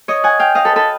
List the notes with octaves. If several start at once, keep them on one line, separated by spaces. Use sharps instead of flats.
C#5 D#5
F#5 G#5
F5 G5
D#5 F5
A4 B4
A4 B4